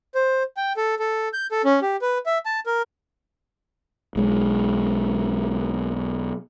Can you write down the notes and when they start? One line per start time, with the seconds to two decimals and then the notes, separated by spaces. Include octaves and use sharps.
0.15 C5
0.57 G5
0.77 A4
0.99 A4
1.33 G6
1.52 A4
1.65 C#4
1.82 G4
2.02 B4
2.26 E5
2.46 A5
2.66 A#4
4.16 B1 G#3